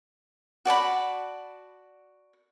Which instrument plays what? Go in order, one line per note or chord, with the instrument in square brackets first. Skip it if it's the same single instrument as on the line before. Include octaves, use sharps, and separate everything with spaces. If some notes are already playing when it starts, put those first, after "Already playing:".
[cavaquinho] F#4 D5 A5 B5